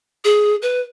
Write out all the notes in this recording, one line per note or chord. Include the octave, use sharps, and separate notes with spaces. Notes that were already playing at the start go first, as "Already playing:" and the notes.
G#4
B4